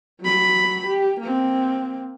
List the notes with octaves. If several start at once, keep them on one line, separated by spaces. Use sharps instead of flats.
F#3 B5
G4
A#3 C4